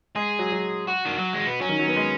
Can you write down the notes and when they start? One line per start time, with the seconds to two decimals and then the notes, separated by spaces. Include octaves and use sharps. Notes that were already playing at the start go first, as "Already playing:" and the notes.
0.16 G#3 G#4
0.39 F#3
0.52 F#3
0.87 F#4
1.05 D#3
1.19 F#3
1.33 G#3
1.46 B3
1.61 F#3 C#4
1.69 D#3
1.79 F#3
1.88 B3
1.96 G#3